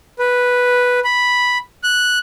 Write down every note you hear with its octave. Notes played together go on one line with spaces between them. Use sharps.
B4
B5
F#6